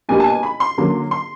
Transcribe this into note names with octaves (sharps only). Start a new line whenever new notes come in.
B2 G3 A#3 D4 G#5
A5
G#5
B5
C6
D3 F#3 A#3 C#4
C6